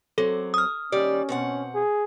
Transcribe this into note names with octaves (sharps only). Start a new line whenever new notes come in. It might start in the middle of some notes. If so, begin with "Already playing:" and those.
F#2 F#3 C4 A4
D#6 F6
D#2 G3 C#4 D5
B2 C4 F#5
G#4